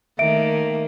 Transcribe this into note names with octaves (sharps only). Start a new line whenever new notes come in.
D#3 A3 A#3 E5 D7